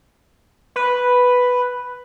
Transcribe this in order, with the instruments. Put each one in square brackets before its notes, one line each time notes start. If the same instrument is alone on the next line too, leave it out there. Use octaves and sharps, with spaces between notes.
[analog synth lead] B4